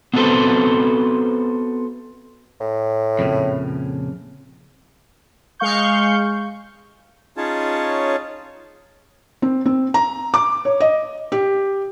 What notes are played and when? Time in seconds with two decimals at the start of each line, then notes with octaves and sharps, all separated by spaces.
0.14 B3 C4 F#4 A4 B4 C5
2.61 A2
3.19 F2 A#2 C#3
5.59 G#3 F5 C#6 G6
7.37 C#4 D#4 F4 G#4 C#5 A5
9.42 C4
9.66 C4
9.94 A#5
10.34 D6
10.65 C#5
10.81 D#5
11.32 G4